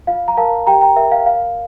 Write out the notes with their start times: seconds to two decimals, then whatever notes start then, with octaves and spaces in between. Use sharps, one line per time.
0.07 F4 F5
0.28 A#5
0.37 A#4 F5 A5
0.67 G4 G5 A#5
0.81 G5 A#5
0.96 A#4 E5
1.12 F5
1.25 C#5 F5